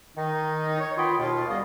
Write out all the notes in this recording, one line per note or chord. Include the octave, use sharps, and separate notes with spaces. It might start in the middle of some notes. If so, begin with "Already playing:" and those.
D#3 D#4
C#5
D#3 B3 F4 G5 B5 D#6
D#2 B2 F4
C#2 A#2 G3 B3 D#5 F5